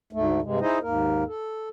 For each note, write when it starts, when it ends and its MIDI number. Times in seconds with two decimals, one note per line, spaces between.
0.13 0.41 38
0.13 0.41 44
0.13 0.41 57
0.42 0.59 43
0.42 0.59 48
0.42 0.59 56
0.61 0.79 63
0.61 0.79 64
0.61 0.79 68
0.61 0.79 72
0.61 0.79 75
0.82 1.24 39
0.82 1.24 44
0.82 1.24 58
0.82 1.24 70
1.27 1.69 69